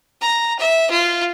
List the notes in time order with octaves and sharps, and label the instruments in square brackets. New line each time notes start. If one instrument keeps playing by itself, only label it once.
[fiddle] A#5
E5
F4